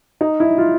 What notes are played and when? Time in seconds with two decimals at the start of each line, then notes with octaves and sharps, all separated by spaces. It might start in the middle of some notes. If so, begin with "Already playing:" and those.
0.21 D#4
0.40 E4
0.58 F4